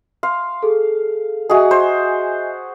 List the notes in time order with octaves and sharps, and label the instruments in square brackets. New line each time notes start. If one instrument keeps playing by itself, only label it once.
[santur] F5 [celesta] C6
[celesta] G#4 A4
[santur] F#4 G#4 [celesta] D#5 E5 G#5
[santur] C5